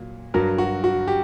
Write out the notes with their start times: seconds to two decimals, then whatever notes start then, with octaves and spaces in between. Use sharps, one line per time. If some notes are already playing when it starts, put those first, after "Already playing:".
Already playing: A#2 F#3
0.34 G2 F#3 A#4
0.58 F#4
0.84 F#4
1.08 G4